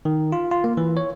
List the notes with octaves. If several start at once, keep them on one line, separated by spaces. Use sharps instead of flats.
D#3
F4
F4
A#3
E3
C#5